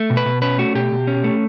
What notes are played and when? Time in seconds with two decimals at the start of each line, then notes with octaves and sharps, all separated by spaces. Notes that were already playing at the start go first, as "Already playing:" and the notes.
Already playing: A3
0.10 B2
0.17 B4
0.26 B2
0.42 C#4 B4
0.58 A3 F#4
0.75 B2 G4
0.92 B2
1.07 C#4
1.24 A3